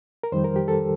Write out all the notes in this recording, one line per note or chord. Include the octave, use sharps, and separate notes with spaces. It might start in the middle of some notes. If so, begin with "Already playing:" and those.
A#4
F2 D#3 G3 C5
A#4
G4
A4